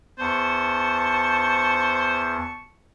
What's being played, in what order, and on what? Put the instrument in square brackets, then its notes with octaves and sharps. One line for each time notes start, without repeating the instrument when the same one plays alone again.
[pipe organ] E2 [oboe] C5 [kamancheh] A5 C#6